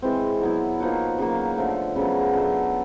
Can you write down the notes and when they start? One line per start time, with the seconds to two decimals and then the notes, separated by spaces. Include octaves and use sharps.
0.02 E3 G#3 C4
0.42 F#3 B3 E4
0.80 F3 A#3 D#4 F#4
1.19 C#3 F#3 A#3
1.58 D3 F3 A3
1.96 C#3 F#3 B3
2.35 F#3 A3 D4